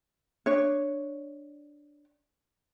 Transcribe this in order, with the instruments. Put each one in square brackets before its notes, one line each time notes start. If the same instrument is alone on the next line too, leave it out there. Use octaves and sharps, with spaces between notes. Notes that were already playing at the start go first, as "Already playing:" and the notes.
[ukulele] D4 C#5